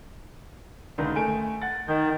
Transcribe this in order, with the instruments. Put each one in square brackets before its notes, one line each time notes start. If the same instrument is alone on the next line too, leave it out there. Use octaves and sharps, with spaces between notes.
[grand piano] C#2 D3 D#3
A3 G#5 D7
F#5 A6
[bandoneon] D#3 [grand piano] G6